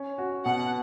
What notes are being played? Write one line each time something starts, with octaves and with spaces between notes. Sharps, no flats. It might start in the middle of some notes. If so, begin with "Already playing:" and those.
Already playing: C#4
F#4
B2 F#5